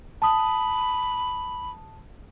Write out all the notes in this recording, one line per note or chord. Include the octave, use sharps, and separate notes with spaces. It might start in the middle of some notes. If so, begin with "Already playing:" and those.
A5 B5 D#6